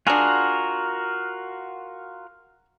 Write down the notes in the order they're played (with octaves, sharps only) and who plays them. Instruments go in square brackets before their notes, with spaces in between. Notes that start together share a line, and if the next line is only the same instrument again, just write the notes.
[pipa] D4 G#4 [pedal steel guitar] F4 F#4 A#4